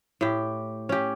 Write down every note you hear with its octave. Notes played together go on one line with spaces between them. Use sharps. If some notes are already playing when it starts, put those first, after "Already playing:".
A2 G4
C#4 G4